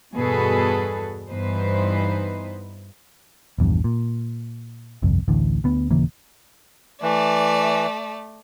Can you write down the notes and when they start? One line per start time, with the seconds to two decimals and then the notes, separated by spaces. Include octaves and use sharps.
0.13 E2 G2 B2 G#4 A4 B4
1.29 G2 E3 B3 D#4 B4 C5
3.58 A#1 E2 G2
3.84 A#2
5.02 G1 C2 F2
5.28 A1 D2 A2
5.64 D2 B3
5.91 D#1 C#3 E3 A#3
7.03 E3 A3 D5